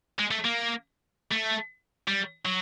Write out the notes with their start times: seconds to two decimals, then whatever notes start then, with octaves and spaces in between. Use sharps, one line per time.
0.19 G#3
0.31 A3
0.45 A#3
1.32 A3
2.08 G3
2.45 F#3